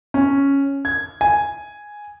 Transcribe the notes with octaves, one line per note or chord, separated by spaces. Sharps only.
C#4
G#6
G#5